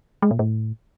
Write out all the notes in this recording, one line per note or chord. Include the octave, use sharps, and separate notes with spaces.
G#3
A#2
A2